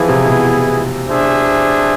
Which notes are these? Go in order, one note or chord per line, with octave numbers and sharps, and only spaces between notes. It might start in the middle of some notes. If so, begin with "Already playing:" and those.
Already playing: E3 F3 B3 E4 G#4
C3
B2
D4 G#4 C5 E5